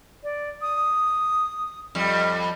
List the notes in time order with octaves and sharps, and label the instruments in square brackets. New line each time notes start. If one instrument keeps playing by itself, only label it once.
[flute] D5
D#6
[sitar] F2 G3